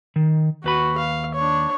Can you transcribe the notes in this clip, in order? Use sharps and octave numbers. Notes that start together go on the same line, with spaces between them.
D#3
D#2 F#4 B4 B5
F5
D4 C#5